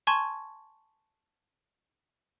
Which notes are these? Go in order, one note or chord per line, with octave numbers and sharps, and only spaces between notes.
G#5 A5 C6 C#6 G#6